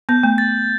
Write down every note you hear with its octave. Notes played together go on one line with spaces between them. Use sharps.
B3 G6
A3
A6